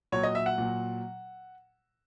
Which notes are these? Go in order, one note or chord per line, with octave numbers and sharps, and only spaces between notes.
A#2 F#3 C#5
D#5
E5
F#5
A#2 F#3